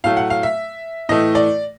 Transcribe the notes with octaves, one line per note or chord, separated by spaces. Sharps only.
A2 F#3 A3 F5
F#5
F5
E5
A2 E3 A3 D#5
D5